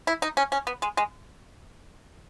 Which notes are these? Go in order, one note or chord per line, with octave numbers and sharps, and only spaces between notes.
E4
D#4
C#4
C#4
B3
G#3
G#3